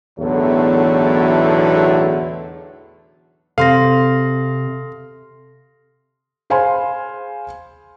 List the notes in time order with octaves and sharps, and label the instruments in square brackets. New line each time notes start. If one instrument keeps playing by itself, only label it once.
[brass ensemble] B1 E2 A2 D3 F#3 A3
[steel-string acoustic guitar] C3 [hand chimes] A4 C6 A#6 [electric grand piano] F5
[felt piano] G#4 C5 F5 G#5 B5 C6